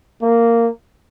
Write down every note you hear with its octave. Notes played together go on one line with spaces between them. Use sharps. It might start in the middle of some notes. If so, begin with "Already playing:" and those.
A#3